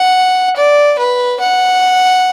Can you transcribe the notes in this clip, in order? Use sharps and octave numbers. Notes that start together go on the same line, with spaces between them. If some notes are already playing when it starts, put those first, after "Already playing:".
Already playing: F#5
D5
B4
F#5